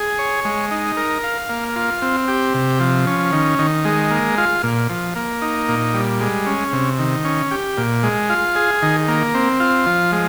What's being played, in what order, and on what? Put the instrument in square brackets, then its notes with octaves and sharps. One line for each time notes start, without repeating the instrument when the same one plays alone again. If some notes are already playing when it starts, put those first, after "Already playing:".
Already playing: [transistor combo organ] G#4
C#5
G#3
D#4
A#4
F5
A#3
F4
C4
G4
C3
F3
C#4
D#3
D#3
G#3
A#3
F4
A#2
F3
A#3
D#4
A#2
G3
G#3
C#4
C3
D#3
C#4
G4
A#2
G#3
F4
G#4
D#3
A#3
C4
F4
F3
G#3